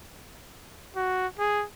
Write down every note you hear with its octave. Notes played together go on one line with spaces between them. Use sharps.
F#4
G#4